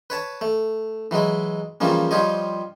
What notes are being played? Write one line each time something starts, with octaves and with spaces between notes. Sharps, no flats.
B4 C#5 A5
A3
E3 F#3 G#3 E4
C#3 E3 F3 G3 A#3 C#4
F3 G3 F4 G4 C#5 D#5